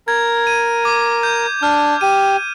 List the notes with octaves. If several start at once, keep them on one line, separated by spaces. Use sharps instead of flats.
A#4 G#6
D#7
D6
G6
D4 F6
G4 D#7